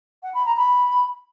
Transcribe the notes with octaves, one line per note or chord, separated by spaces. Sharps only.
F#5
B5
A#5
B5